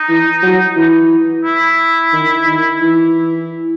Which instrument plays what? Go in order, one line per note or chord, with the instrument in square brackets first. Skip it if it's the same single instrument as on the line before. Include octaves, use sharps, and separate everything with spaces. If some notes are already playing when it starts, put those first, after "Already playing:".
Already playing: [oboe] D#4
[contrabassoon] E3
F#3
E3
[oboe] E4
[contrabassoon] D#3
D#3
E3